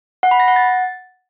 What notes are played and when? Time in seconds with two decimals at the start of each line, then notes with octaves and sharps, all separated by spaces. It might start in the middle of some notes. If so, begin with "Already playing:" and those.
0.23 F#5
0.31 B5
0.40 A#6
0.48 F#5
0.56 A6